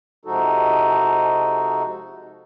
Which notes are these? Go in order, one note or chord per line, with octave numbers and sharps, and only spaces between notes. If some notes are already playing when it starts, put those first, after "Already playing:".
C3 F3 G#3 D#4 F#4 A4